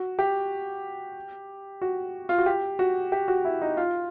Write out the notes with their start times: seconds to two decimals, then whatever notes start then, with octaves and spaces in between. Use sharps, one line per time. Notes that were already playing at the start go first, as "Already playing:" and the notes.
Already playing: F#4
0.19 G4
1.82 F#4
2.29 F4
2.38 F#4
2.46 G4
2.79 F#4
3.12 G4
3.28 F#4
3.45 E4
3.62 D#4
3.77 F4